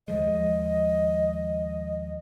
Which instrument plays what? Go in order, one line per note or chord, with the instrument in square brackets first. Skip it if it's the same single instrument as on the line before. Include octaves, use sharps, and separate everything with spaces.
[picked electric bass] D#2 F3 G#3 [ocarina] D#5